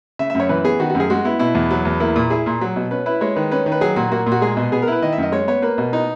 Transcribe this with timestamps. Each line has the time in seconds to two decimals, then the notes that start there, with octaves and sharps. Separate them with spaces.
0.19 C#3 E5
0.30 E5
0.35 F#2
0.40 C#5
0.49 E3 B4
0.64 B3 G#4
0.80 D#3 F#4
0.90 F#4
0.95 F#2
1.00 G#4
1.10 G#3 F#4
1.25 B3 E4
1.39 B2 E4
1.55 E2
1.71 F#3
1.85 E2
2.00 A#3 E4
2.16 A#2
2.30 E4 G#4
2.46 A#2
2.61 F#3
2.76 B2
2.91 C#4 B4
3.06 E4 B4
3.21 G#3 C#5
3.36 D#3 B4
3.51 C#4 B4
3.66 D#3
3.72 B4
3.81 F#3 G#4
3.96 A#2 F#4
4.12 A#3 F#4
4.26 A#2
4.32 F#4
4.41 G#3 G#4
4.57 B2
4.72 B3 G#4
4.82 A#4
4.87 E4 B4
5.02 D#3 D#5
5.13 E5
5.18 F#2 D#5
5.32 G#3 C#5
5.48 B3 C#5
5.62 A#3 B4
5.78 B2
5.93 D#4